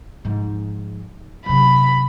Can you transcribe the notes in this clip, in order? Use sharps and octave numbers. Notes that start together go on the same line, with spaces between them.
G#2 F3
F#2 C3 B5